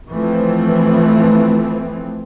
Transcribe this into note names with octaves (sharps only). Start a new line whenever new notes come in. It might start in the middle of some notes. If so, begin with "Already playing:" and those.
E3 F3 A3 C4